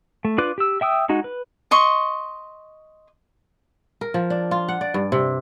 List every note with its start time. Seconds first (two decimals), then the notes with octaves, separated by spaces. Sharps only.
0.25 A3
0.38 D4 F4 B4 D6 F#6
0.58 G4 E6
0.81 E5 G5 D#6 E6
1.09 G#3 D#4 F#4
1.24 B4
1.71 D#5 C6 C#6
4.01 A#4
4.14 F3
4.30 D4
4.51 F4
4.68 F#5
4.81 D5
4.94 G2
5.12 C3